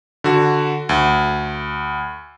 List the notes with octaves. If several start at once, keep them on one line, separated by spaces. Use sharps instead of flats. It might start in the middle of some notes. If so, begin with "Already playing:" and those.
D3 F#4
D2